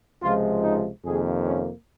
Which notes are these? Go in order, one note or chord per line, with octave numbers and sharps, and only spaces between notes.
C#2 C3 F3 G#3 F4
D#4
F2 C3 D#3 A#3 G#4
C#4